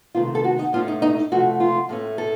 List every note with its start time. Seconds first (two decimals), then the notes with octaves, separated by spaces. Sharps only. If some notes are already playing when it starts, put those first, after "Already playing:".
0.15 C3 D#3 A3 C4 F4
0.35 A4
0.44 F#4
0.59 D#4
0.73 A2 A3 C#4 F4
0.88 D#4
1.02 D#4
1.32 C3 F3 A3 F#4
1.60 F4
1.89 A2 A3 C#4
2.18 A4